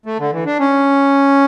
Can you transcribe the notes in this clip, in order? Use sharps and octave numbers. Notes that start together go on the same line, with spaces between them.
A3
D3
E3
D4
C#4